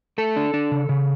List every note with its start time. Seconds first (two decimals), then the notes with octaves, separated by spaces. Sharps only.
0.18 A3 A4
0.36 D4
0.54 D4
0.71 C#3
0.89 C#3